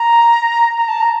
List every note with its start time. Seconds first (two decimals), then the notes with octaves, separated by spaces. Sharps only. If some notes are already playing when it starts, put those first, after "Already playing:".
Already playing: A#5
0.77 A#5
0.88 A5
1.00 A#5